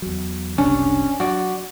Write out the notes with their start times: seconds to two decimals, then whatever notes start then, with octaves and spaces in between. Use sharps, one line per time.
0.02 E2 F#3
0.58 F#1 C2 C3 C#4 D4
1.20 F#3 F#4 D5